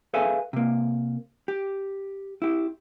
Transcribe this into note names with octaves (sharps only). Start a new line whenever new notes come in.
G#4 A4 B4 E5 F5 G#5
C3 A#3
G4
E4 G4